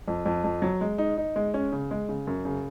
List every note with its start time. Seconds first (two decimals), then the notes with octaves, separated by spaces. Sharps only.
0.08 F2
0.26 F2
0.44 F2
0.62 F#3
0.81 G#3
0.98 D#4
1.17 D#4
1.36 G#3
1.54 C#4
1.72 C#3
1.91 G#3
2.09 C#3
2.27 F#2
2.45 C#3